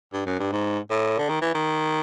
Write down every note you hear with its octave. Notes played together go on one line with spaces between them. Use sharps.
G2
F#2
G2
G#2
A2
D3
D#3
E3
D#3